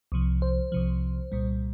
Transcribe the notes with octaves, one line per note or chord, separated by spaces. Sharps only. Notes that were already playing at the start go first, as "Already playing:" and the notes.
C2 C3 F3
C5
C2 C3 F3
C2 A#2 G3